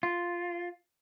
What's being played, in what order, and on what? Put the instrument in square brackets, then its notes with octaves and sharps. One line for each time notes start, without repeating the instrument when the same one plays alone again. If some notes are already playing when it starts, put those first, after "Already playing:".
[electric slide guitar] F4